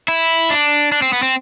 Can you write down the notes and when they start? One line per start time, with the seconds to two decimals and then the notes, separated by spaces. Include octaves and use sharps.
0.08 E4
0.50 D4
0.92 D4
1.02 C4
1.13 B3
1.23 C4